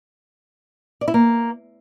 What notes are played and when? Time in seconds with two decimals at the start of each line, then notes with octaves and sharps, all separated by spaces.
1.01 D5
1.08 E4
1.14 A#3